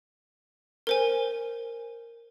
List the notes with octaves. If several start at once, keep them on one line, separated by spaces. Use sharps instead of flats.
A#4 C5 G#5